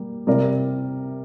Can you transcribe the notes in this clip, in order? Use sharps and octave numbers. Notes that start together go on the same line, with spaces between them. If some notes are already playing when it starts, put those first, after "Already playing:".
Already playing: G3 A#3
C3 G3 C4 A#4 D5